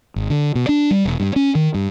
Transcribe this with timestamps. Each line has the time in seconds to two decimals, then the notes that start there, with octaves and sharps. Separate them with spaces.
0.16 G#1
0.30 D3
0.55 B2
0.69 D4
0.91 G3
1.05 E1
1.20 G2
1.36 C#4
1.55 D#3
1.74 G2